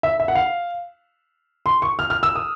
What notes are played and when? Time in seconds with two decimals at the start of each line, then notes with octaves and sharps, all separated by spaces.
0.03 E5
0.20 E5
0.28 F#5
0.35 F5
1.66 C6
1.82 C#6
1.99 F6
2.10 F6
2.23 E6
2.35 D#6